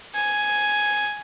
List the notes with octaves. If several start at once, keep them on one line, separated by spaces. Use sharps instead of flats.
G#5